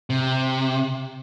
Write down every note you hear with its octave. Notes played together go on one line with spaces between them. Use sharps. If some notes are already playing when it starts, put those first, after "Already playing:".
C3